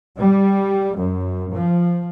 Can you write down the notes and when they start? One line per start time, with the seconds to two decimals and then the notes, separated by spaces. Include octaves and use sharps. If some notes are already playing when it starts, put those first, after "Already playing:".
0.19 G3
0.99 F#2
1.55 F3